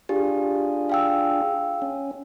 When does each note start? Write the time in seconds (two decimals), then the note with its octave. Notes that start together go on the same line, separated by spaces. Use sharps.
0.09 D4 F4 G4 G#4
0.89 F5 G5 E6
1.82 C#4